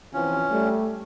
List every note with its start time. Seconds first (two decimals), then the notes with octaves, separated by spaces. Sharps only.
0.13 C3 E3 F3 C#4
0.51 G3 A3